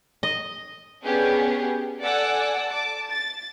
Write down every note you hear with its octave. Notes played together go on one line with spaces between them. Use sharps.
D#5
B3 C#4 D4 G4 G#4
A4 D5 F#5 G#5 D6 E6
A5 D6
A6